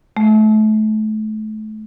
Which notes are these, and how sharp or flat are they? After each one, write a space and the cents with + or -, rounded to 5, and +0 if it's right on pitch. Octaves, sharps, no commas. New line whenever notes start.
A3 -30